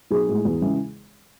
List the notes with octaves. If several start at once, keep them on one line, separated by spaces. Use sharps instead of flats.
B1 G#4
A2 G#3
E2
C#3 E3 G#3